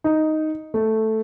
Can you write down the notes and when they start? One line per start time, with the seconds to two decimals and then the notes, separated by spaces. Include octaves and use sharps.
0.04 D#4
0.74 A3